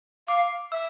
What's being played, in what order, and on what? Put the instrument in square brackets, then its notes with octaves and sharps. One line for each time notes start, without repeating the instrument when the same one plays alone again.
[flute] F5 [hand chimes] D6
[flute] E5 [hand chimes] E6